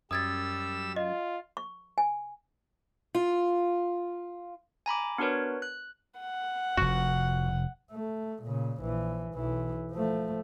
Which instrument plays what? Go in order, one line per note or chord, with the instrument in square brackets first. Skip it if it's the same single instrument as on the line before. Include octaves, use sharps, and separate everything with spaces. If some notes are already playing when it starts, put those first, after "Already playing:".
[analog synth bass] F#2 [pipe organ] G3 E6 [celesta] D#6 G#6 A6
[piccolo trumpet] F4 [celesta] D#5
[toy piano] C#6
G#5
[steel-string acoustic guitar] F4
[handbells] G#5 A#5 B5 D6
B3 D4 F#4 A#4 B4 C#5
F#6
[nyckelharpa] F#5
[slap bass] F1 F2 [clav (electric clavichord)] F#4
[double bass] A3
A#2 C#3
A#1 E3
B1 E3
F3 A3